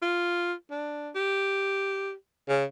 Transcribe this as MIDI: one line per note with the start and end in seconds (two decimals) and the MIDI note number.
0.02 0.53 65
0.71 1.10 62
1.15 2.13 67
2.49 2.65 49